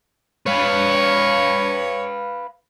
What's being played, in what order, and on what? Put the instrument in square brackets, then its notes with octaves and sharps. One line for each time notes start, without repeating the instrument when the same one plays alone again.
[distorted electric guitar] B4 F5 [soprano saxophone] C#5